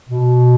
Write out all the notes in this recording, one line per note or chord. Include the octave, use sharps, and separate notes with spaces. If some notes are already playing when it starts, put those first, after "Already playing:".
B2